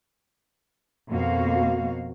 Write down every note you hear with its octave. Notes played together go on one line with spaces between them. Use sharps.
F2 B2 A#3 F#4 F5